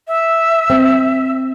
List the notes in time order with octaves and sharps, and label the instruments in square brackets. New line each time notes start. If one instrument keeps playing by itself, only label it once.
[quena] E5
[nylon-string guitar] C4